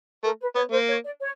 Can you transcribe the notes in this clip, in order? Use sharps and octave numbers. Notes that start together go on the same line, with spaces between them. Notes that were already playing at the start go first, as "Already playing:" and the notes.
A3 A#4
B4
B3 C#5
A#3 C5
C#5
D5
C#5